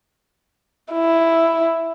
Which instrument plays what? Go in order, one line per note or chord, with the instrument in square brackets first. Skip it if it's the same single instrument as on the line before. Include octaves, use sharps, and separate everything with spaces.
[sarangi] E4